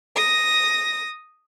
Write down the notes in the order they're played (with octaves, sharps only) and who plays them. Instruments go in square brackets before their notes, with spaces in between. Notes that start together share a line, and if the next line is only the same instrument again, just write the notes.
[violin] D#6 A#6